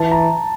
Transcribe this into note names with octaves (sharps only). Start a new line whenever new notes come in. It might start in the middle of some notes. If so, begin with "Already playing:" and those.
Already playing: E3 A5
A#5